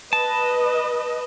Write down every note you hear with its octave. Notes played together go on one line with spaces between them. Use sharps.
B4 D#5 A5